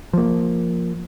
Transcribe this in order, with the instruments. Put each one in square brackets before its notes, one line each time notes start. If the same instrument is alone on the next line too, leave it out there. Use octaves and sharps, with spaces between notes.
[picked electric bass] F3 A#3